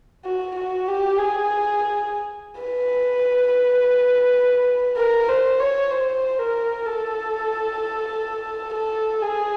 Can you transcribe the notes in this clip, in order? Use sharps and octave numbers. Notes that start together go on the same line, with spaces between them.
F#4
F#4
G4
G#4
B4
A#4
C5
C#5
C5
A#4
A4
A4
G#4